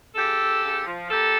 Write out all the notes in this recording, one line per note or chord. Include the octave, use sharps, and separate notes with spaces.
C#3 G4 A4
C#3
C#3
F3
A#3 G4 A4